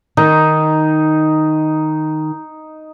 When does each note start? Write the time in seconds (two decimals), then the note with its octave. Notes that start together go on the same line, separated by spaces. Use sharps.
0.17 D#3 D#4